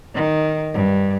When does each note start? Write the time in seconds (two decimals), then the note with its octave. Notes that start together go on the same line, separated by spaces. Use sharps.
0.14 D#3
0.73 G2